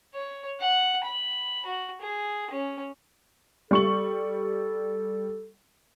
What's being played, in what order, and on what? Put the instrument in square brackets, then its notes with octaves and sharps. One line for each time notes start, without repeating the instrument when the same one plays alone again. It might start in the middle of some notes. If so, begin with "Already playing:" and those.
[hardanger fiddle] C#5
F#5
B5
F#4
G#4
C#4
[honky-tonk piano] G3 C#6 F#7 [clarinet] A4